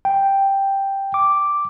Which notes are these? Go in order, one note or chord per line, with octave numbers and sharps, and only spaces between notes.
G5
D6